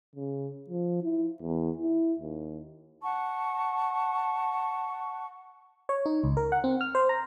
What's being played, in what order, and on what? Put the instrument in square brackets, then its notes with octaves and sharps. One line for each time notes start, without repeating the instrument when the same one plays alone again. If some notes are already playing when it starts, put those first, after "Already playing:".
[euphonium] C#3
F3
E4
E2
E4
D#2
[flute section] F#5 A5 C#6
[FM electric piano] C#5
D#4
C#2
A#4
F#5
C4
F6
C5
A#5